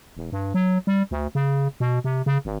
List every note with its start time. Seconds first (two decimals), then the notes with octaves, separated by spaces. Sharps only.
0.17 E1
0.32 G2
0.54 F#3
0.87 G3
1.11 D2
1.35 C#3
1.80 B2
2.04 C3
2.26 C#3
2.45 G#1